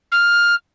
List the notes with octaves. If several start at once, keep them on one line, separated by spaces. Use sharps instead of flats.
F6